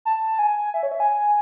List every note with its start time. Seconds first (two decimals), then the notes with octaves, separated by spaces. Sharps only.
0.05 A5
0.39 G#5
0.74 E5
0.83 C#5
0.91 E5
1.00 G#5